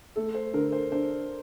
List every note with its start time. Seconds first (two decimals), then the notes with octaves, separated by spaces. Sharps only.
0.16 A3 A4
0.35 C5
0.54 D3 A#4
0.72 C5
0.92 D4 C5